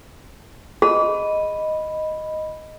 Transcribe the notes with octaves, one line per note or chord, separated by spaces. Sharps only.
G#4 D#5 B5